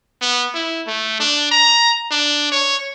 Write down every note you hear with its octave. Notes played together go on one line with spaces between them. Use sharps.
B3
E4
A3
D4
A#5
D4
C#5